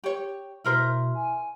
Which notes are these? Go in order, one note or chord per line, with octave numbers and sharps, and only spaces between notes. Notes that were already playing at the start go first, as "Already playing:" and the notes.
G4 C#5
B2 E4 A#4 C5
G#5